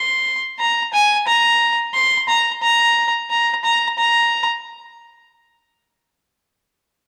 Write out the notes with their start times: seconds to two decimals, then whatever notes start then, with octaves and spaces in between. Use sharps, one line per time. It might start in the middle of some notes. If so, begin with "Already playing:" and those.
Already playing: C6
0.59 A#5
0.93 G#5
1.27 A#5
1.94 C6
2.28 A#5
2.62 A#5
3.30 A#5
3.64 A#5
3.98 A#5